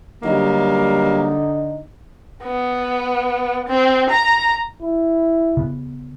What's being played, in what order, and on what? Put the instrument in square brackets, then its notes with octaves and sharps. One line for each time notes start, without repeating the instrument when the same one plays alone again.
[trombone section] D3 D#4 [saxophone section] F#3 G3 A#3
[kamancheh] B3
C4
A#5
[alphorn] E4
[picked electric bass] C#3 B3